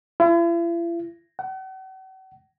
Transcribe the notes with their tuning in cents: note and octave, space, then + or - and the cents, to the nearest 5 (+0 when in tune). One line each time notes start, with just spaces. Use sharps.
E4 +45
F#5 +45